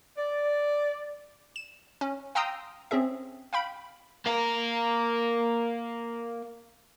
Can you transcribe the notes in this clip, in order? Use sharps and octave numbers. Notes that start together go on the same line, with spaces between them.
D5
E7
C#4
F5 G5 A#5 C6 D#6 E6
C4 C#4 G#4 E5
F5 G5 B5
A#3 A#4